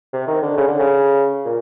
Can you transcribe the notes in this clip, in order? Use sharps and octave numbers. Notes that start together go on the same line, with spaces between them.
C3
D#3
D3
C#3
D3
C#3
A#2